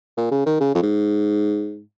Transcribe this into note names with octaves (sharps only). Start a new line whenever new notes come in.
A#2
C#3
D#3
C#3
F2
G#2